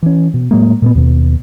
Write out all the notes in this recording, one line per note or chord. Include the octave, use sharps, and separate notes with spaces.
E3 C#4
B2
A2 F#3 G#3 A#3
A#2 G#3 B3
D#2 B2